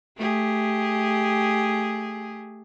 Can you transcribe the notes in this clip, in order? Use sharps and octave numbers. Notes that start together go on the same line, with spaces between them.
A3 G4 G#4